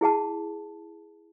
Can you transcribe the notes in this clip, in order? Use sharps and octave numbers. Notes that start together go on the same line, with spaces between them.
E4 G#4 F#5 A5